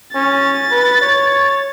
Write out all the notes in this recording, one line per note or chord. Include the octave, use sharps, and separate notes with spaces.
C#4 A6
B4
C#5